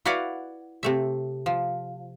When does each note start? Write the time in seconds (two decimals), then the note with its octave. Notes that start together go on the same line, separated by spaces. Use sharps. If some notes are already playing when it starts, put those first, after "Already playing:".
0.05 E4 F#4 B4 D5 F5 F#5
0.83 C3 A3 E5
1.46 F3